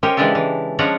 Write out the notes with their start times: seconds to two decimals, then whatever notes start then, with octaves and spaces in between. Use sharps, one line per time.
0.03 C#4 G4 A#4 C5 C#5 D#5
0.17 C#3 E3 G#3 D4 G4 A4
0.35 E3
0.79 F3 G#3 C#4 D4 F#5 A#5